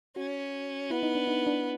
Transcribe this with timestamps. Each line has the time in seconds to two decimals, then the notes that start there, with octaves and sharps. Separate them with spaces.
0.16 C#4 F#4
0.90 B3 E4
1.03 D#4
1.15 D4
1.27 D#4
1.47 D4